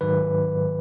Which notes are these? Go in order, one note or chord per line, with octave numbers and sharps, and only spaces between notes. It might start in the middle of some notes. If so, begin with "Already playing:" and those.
G#2 D#3 F#3 B4